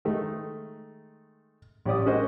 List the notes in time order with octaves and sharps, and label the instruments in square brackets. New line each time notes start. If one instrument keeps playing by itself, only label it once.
[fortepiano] D#3 G#3 A3 D#4
A1 G4 D5 D#6
G#3 C#4 F#4 A#4 C5 D#5